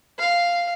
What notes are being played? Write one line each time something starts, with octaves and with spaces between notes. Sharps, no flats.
F5